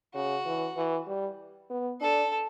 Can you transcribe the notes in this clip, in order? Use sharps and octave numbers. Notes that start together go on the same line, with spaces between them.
C#3 F#4
E3
E3
G3
B3
D4 A4